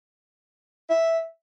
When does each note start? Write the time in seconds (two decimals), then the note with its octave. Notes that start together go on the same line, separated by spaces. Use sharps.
0.89 E5